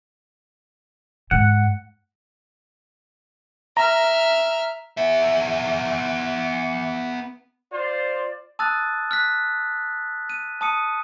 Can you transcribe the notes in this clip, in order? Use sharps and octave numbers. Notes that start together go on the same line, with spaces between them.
G#2 F#5
E5 A#5 F6
B3 E5
F4 C5 D5
A5 D#6 E6 F#6 A6
F6 F#6 B6
D#7
A5 D#6 C#7